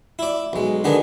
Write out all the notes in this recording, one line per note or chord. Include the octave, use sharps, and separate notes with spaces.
E4 D5
B1 G#3
D3 D#3 B3 D4 G#4